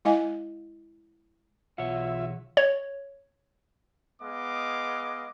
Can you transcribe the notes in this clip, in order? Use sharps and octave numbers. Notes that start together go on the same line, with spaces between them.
G#3 E4 D#5 F5 G#5
B1 E3 F4 C#5 E5 F#5
C#5
G#3 B3 D#5 F5 D6